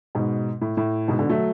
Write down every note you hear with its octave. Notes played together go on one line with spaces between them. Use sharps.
G#2 B2
A2
A2
G#2 B2
B2 D3
F#3 A3